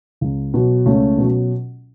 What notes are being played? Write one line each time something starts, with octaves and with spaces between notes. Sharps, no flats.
C#2
B2 F#3
C#2 A3 C#4
B2 F#3